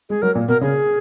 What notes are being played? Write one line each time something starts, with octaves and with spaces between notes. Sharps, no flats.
G#3 G#4
F#3 A#4
A#2
B2 A#4
C#3 G#4